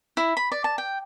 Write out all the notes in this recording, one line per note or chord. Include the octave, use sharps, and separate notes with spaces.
E4
B5
D5
A5
G5